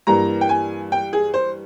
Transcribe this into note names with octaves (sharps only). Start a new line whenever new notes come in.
G2 E3 G3 A#3 A#5
G5
G#5
G5
G#4
C5